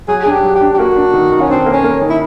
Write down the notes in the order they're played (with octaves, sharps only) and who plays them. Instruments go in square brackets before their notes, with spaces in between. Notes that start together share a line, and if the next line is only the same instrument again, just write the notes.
[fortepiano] F#3 [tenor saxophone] G#4
[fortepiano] D4 [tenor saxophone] G#4
[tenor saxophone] G4
[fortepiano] F#3
[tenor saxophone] G4
[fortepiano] D4
[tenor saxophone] G4
[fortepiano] A#3 [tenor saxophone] F#4
[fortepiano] D4
D#3
D#3
[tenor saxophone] C#4
[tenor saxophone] C4 [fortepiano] D4
[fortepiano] A#3
[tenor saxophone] C#4
[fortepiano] A#3
D#3
[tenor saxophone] E4